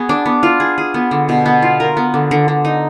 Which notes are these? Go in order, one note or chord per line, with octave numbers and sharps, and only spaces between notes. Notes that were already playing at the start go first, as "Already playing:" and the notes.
Already playing: B3 F#4 G#4
D4
B3
F4
G#4
G#4
B3
D3
B2
B3
F4
A#4
B3
D3
D3
D3
D#4